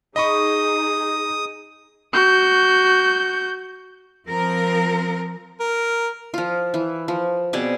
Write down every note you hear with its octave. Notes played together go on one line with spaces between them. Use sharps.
D#4 G#4 D#5 B5 C#6 D#6
F#4 G6
F3 C4 A#4
A#4
F3 F4
E3
F3
B2 C4 G#4 D5